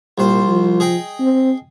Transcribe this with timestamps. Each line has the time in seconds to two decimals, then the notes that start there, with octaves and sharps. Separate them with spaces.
0.18 C2 A#2 C5
0.47 F3
0.80 G#4 D#5 G5
1.20 C4